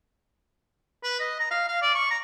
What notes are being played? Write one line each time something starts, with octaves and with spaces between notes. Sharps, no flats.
B4
D#5
A#5
F5
F5
D5
C#6
A#5